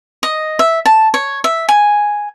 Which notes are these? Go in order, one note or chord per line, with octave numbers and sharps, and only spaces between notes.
D#5
E5
A5
C#5
E5
G#5